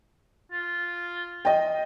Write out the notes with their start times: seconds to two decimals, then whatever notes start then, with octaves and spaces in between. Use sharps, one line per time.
0.52 F4
1.45 D#5 G5